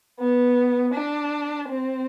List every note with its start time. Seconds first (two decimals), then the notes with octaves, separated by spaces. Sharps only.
0.20 B3
0.94 D4
1.68 C4